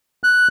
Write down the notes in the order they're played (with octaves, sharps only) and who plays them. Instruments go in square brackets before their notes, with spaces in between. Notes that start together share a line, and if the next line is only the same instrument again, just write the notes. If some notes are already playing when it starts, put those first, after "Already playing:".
[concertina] F#6